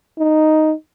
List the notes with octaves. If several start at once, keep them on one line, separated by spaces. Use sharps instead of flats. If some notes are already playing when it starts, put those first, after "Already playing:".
D#4